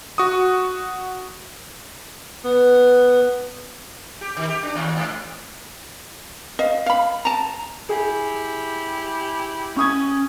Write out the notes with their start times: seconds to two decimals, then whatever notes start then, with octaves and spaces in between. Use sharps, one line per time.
0.18 F#4 C#6 D#6
2.44 B3
4.21 G4
4.37 D#3
4.49 G4
4.63 D4
4.75 D#2
4.97 G#2
6.59 D#5 F5
6.86 F5 B5
7.25 A5 A#5
7.89 E4 G4 G#4
9.77 C#4 C#6 D#6 G#6